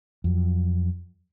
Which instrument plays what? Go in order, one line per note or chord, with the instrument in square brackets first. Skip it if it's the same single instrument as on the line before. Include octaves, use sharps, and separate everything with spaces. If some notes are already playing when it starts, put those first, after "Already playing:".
[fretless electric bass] F2 F#3